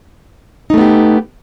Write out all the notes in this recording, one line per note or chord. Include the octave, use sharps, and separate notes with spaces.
A3 B3 D#4 G4